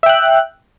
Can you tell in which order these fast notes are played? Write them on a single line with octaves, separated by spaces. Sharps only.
E5 G5 F#6